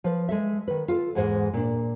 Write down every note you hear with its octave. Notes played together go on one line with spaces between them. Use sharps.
F3 B4
G#3 A4 E5
D#3 B4
F4 A4
E2 G#2 G#3 C5 F#5
A#2 D4